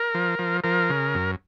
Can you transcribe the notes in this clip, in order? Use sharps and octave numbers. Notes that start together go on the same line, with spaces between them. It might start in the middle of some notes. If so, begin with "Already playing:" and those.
Already playing: A#4
F3
F3
F3 A#4
C#3
F#2